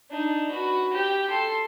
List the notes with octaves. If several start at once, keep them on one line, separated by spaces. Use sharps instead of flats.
D4 D#4
F#4 B4
G4 G5
A4 C6